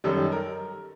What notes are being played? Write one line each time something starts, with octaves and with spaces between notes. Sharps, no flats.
F#2 D#3 G3 A4
A#4